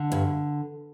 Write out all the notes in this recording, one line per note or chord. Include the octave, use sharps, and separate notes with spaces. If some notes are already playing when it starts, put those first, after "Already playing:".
Already playing: D3
G2